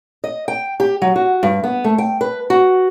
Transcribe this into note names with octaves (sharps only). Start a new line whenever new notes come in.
D#5
G5
G4
F#3
F#4
G2
B3
A3
G5
B4
F#4